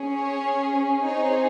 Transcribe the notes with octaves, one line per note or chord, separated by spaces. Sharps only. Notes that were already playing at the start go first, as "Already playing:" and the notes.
Already playing: C#4 G#4
C#5
C4 D#4 G#4 C#5